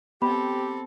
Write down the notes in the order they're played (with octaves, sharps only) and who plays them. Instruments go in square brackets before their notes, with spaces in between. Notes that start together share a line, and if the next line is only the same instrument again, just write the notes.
[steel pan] B3 [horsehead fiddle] C4 A4 [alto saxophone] G4 [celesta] B5